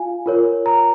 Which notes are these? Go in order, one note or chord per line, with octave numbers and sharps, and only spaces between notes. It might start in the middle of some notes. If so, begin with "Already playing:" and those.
Already playing: F4 F5 G#5
F4 A#4 C#5
A#5